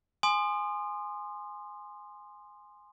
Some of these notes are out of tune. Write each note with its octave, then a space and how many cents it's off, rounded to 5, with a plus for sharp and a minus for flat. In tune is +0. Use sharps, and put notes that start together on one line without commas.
G#5 +0 C6 +0 D#6 -35